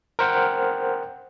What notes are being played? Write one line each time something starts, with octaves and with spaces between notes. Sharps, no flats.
A#4 C5 F#5 G5